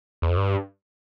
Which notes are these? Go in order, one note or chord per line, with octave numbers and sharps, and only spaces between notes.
E2
F2
G2